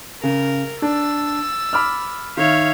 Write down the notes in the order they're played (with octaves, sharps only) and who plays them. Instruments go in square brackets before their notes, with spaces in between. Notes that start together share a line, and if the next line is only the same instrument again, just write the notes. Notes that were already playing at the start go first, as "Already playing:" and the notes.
[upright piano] C#3 [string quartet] A#4
[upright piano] D4 [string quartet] E6 A6
[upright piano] B5 D6 F6
[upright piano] D#3 [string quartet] C#5 E5 F5